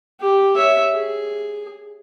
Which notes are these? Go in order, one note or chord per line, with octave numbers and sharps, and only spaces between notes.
G4
C#5 E5
G#4